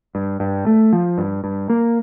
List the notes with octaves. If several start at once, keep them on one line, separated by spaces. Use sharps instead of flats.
G2
G2
A3
F3
G2
G2
A#3